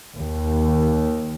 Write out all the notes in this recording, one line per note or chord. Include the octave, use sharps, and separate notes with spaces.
D#2